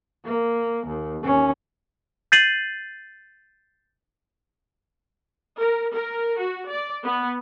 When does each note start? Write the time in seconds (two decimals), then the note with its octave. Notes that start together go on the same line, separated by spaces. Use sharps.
0.25 A#3
0.87 D#2
1.23 D#2 C#4
2.32 G6 A6 C7 D#7 F#7
5.59 A#4
5.95 A#4
6.39 F#4
6.69 D5
7.05 B3